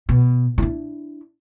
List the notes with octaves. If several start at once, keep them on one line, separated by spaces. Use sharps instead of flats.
B2
D4 E4